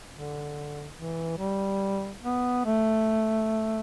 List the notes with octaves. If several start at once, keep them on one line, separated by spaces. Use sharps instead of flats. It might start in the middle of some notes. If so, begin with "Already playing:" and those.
D3
E3
G3
B3
A3